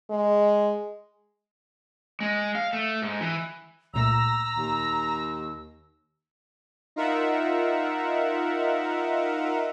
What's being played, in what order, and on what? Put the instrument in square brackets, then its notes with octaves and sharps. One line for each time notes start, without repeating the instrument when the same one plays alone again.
[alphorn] G#3
[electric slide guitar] G#3
F5
A3
G#2
E3
[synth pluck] C#2 A#2 A3 [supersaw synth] A#5 A#6 [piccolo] E6
[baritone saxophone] D#2
[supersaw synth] D#4 F4 A#4 E5 F#5